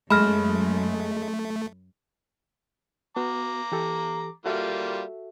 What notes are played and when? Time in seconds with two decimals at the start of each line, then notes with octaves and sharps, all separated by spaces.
0.10 F#2 G#3 A3 B5 F6 A#6
3.16 B3 F#4 A#5 D6
3.72 E3 G4 A4
4.46 G3 A#3 F4 F#4 A4 E5